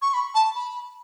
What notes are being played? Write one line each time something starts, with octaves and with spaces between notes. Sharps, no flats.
C#6
B5
A5
B5